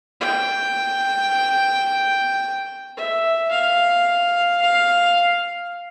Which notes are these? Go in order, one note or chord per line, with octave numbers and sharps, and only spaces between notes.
G5
E5
F5
F5